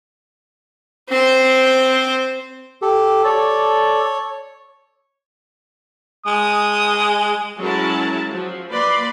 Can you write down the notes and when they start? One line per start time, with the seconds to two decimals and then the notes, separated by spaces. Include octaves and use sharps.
1.09 C4 C5
2.82 G4 A4
3.24 A4 C#5 D5
6.26 G#3 D#6
7.59 F#3 G#3 C#4 E4 A#4 A5
8.31 F3 F#3
8.70 A#3 B4 D5 B5 C6